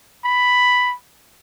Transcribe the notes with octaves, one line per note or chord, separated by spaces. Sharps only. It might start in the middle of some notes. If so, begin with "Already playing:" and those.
B5